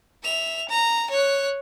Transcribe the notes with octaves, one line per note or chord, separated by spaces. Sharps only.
E5 F7
A#5
C#5 F#6